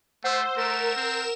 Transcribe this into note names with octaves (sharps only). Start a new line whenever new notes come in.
A3 C5 F#5 E6
A3 A#4 E7
C4